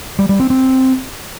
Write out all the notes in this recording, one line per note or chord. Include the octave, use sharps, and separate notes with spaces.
G3
G3
C4
C4